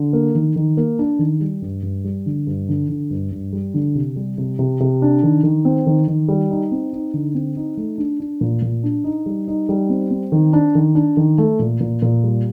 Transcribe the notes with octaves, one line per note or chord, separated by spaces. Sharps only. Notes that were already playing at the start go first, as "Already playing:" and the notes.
Already playing: D3
A#3
D#3
D#3
A#3
D4
D#3
G3
G2
G2
G3
D3
G2
D3
D3
G2
G2
G3
D3
C3
G3
C3
C3
C3
D4
D#3
D#3
C4
D#3
D#3
G3
D#4
C4
D#4
D3
C4
D#4
A3
D4
D4
A#2
A#2
D4
D#4
G3
D#4
G3
C4
C4
D#3
D4
D#3
D4
D#3
A3
A#2
A#2
A#2
G3